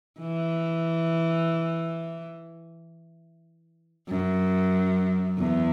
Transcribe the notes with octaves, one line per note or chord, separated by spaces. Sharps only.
E3
F#2
E2